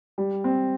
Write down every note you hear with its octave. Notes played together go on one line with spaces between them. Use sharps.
G3
C4